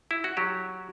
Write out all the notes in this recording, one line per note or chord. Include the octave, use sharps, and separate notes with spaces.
E4
F#4
F#3 G4